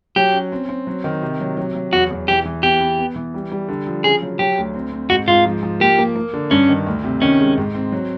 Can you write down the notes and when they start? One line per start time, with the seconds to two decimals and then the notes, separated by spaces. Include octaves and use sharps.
0.16 F#3 G4
0.33 C#4
0.52 C4
0.69 C4
0.87 F#3
1.04 D#3
1.22 C3
1.40 F#3
1.57 F#3
1.75 F#3
1.92 E2 F#4
2.11 E2
2.28 E3 G4
2.45 E3
2.63 B3 G4
2.81 B3
2.99 B3
3.16 E3
3.34 G3
3.52 G3
3.68 D3
3.87 F3
4.04 C#3 G#4
4.22 F#3
4.39 F#3 G4
4.58 D2
4.75 C4
4.92 C4
5.10 G#2 F#4
5.28 G#2 F4
5.45 F3
5.63 F3
5.80 A#3 G4
5.98 A#3
6.16 A#3
6.33 D3
6.51 G2 C#4
6.69 D#3
6.87 D2
7.04 C3
7.22 D#3 C#4
7.39 G#3
7.58 G#2
7.75 C4
7.92 F#3